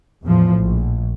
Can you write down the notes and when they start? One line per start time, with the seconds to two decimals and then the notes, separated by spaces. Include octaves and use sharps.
0.24 E2 A2 F3
0.59 A#1